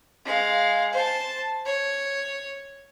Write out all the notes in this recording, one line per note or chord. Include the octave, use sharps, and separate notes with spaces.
G#3 F5
C5 A5
C#5